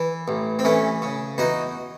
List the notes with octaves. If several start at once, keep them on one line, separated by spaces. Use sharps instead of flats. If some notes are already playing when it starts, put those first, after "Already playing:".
Already playing: E3
A1
C4
E3 A3 C#4
C#3
E2 D#4 F#4